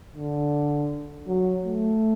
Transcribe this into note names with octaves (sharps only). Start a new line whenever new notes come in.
D3
F#3
A3